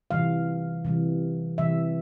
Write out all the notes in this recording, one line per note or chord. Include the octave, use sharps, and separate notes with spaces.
C3 E3 G3 F5
C3 E3 G3
C3 E3 G3 E5